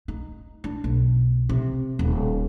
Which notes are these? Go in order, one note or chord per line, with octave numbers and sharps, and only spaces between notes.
D#4
D4
B1
C3
D#1